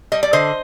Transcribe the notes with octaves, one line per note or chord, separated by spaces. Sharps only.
G3 D#5
D5
D3 C5 D#5